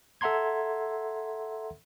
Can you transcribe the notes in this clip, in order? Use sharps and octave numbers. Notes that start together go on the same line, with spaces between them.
A4 E5 F#5 A#5 C6 G#6